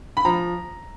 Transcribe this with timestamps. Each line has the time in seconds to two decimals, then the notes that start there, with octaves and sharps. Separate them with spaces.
0.17 B5
0.25 F3 A#5